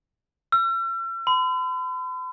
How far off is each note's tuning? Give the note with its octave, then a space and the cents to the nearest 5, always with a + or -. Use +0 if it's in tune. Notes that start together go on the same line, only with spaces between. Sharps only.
E6 +45
B5 +45